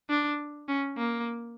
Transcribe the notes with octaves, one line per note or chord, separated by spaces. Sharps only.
D4
C#4
A#3